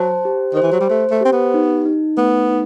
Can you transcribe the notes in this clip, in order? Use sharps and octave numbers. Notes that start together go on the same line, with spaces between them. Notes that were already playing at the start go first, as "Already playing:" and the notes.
Already playing: F#3 C5 A5
G4
D#3 C5
E3
F#3
G3
A3 C5
A3
C4 G4
B3
D#4
D#4
A3 B3
D#4